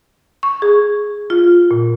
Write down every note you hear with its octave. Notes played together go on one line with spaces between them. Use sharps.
C#6
G#4
F4
A#2